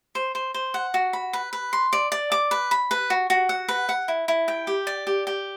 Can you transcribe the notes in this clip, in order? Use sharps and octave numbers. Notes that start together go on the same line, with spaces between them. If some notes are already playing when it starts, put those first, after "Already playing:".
C5
C5
C5
F#5
F#4
B5
B4
B4
C6
D5
D5
D6
B4
B5
B4
F#4
F#4
F#5
B4
F#5
E4
E4
G5
G4
D5
G4
G4